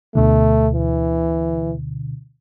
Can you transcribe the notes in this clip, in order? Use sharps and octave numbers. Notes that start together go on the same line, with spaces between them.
D2 B2 D3 A3
E3